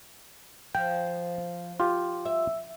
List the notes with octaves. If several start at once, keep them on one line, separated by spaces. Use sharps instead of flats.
F3 G5
F4 G4
E5